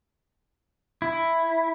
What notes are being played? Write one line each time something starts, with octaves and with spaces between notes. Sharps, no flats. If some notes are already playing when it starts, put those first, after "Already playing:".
E4